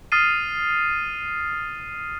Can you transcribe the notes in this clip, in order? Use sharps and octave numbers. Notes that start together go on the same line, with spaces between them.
D#6 F6 A6 C7 D#7